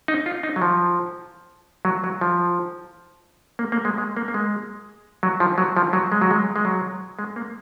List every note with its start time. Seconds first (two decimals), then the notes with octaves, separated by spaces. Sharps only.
0.08 D#4
0.26 F4
0.43 D#4
0.56 F#3
0.62 F3
1.85 F#3
2.04 F#3
2.21 F3
3.59 A#3
3.72 A#3
3.85 G#3
3.98 G#3
4.17 A#3
4.28 A#3
4.34 G#3
5.23 F#3
5.40 F3
5.58 F#3
5.77 F3
5.93 F#3
6.12 G#3
6.21 F#3
6.31 G#3
6.56 G#3
6.65 F#3
7.19 G#3
7.36 A#3